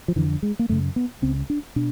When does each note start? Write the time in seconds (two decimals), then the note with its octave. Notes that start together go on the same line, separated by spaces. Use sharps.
0.08 F3
0.16 F2 D3 E3
0.43 G#3
0.59 A#3
0.69 F#2 C#3 A3
0.96 B3
1.22 C#2 C#3 C4
1.50 D4
1.76 B2 D4